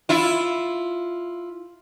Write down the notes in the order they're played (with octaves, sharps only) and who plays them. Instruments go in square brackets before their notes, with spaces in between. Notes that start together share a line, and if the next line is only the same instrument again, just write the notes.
[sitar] E4 F4